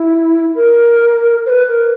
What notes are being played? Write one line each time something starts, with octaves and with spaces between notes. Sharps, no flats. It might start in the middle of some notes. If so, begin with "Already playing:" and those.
Already playing: E4
A#4
C5
B4
A#4